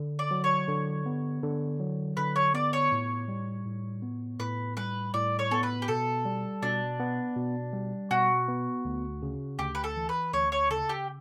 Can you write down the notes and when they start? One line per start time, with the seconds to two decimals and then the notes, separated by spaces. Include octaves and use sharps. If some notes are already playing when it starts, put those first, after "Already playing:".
Already playing: D3
0.19 D5
0.31 F#3
0.44 C#5
0.68 D3
1.06 B3
1.43 D3
1.80 F#3
2.17 D3 B4
2.36 C#5
2.54 B3 D5
2.73 C#5
2.92 A2
3.28 G3
3.65 A2
4.03 B3
4.39 A2 B4
4.77 G3 B4
5.14 A2 D5
5.39 C#5
5.51 B3 A4
5.63 B4
5.82 G4
5.88 B2 A4
6.25 G3
6.62 B2 D4
7.00 B3
7.36 B2
7.73 G3
8.11 B2 F#4
8.48 B3
8.85 D2
9.22 C#3
9.59 D2 G4
9.75 B4
9.84 A4
9.96 E3
10.09 B4
10.33 D2 C#5
10.52 C#5
10.70 C#3 A4
10.89 G4